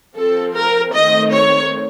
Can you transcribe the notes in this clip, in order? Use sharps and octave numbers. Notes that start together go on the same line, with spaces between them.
F3 C4 A4
A#4
D#3 A3 C4 D#5
C#5